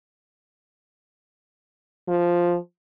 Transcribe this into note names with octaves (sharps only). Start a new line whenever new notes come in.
F3